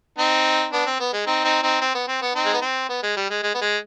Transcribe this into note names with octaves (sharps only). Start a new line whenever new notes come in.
C4 D#4
B3 D4
C4
B3
G#3
C4 D#4
C4 D#4
C4 D#4
C4
B3
C4
B3
C4 D#4
G#3
B3
C4
B3
G#3
G3
G#3
G#3
B3
G#3